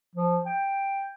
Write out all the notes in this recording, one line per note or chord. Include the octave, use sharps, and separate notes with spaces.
F3
G5